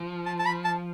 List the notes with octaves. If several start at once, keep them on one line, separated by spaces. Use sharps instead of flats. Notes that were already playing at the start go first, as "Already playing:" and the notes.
Already playing: F3
A5
A5
B5
A5